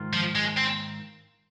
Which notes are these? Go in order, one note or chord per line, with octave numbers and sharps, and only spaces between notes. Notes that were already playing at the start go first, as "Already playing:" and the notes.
Already playing: G#2 D#3 F4
F3
G#3
C4